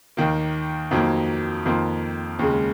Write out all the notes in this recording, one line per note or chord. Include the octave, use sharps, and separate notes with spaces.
D#2 D#3 A#3
F2 D#3 F#3 A#3
F2 D#3 A#3 F4
D#2 C#3 G#3